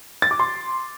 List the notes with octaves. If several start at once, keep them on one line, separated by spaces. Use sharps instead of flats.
A6
D6
C6